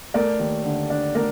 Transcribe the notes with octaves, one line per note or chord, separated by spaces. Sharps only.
A3 A#4 D5
D#2
D3
D4
A3 A#4 D5